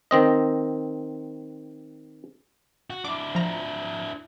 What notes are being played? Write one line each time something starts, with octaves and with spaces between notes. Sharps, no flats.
D#3 C4 D#5
F#4
D4 E4 D6
F3 A#5